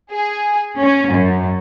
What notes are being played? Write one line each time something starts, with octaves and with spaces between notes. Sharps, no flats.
G#4
C#4
F#2